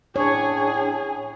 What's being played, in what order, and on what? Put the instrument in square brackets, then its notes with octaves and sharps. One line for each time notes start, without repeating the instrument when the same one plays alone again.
[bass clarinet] A2 [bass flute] D4 [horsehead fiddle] G#4 [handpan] C#5